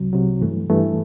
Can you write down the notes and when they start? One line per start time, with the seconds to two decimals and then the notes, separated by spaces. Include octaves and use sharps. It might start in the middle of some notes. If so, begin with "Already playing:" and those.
Already playing: C2 C3 F#3
0.13 C2 C3 F#3
0.41 G2 E3 A3
0.70 G2 E3 A3